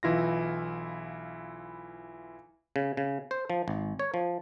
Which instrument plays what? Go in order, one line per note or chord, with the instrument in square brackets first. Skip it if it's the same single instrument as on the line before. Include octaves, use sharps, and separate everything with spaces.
[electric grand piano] B1 E3 E4 F4 A#6
[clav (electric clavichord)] C#3
C#3
C5
F3
G#1
C#5
F3